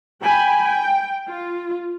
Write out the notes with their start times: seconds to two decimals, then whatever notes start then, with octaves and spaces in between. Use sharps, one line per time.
0.23 G5 G#5 B5
0.65 G5
1.28 F4